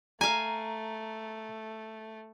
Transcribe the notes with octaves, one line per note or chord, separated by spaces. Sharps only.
A3 F5 G#5 A#5